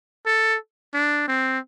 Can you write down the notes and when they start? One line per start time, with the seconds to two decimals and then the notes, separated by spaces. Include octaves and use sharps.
0.26 A4
0.93 D4
1.28 C4